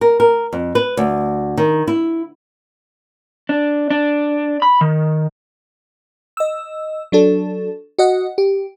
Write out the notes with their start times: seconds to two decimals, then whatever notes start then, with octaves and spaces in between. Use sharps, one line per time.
0.01 A#4
0.20 A#4
0.53 F2
0.75 B4
0.97 D2
1.57 D#3
1.87 E4
3.49 D4
3.90 D4
4.62 B5
4.81 D#3
6.37 D#5 E6
7.12 F#3 D4 A4
7.98 F#4 D#5 F#5
8.38 G4